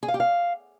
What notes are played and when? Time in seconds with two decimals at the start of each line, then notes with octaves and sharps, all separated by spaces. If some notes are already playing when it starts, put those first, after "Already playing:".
0.03 G#4
0.08 F5
0.14 G4
0.20 F5